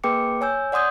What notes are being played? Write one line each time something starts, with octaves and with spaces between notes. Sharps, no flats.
A#3 G#4 B4 G5 D6 C#7
C#5 G#5 E6 G6
D5 F#5 C6 D#6 G6 G#6